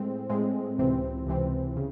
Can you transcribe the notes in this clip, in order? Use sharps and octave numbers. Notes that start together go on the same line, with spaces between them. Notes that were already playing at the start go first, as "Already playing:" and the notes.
Already playing: A2 G#3 C4
A2 G#3 C4
C#2 C3 E3 C4
C#2 C3 E3 C4
C#3